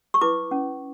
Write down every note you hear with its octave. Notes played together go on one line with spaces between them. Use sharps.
C#6
E4 B4 D6
C#4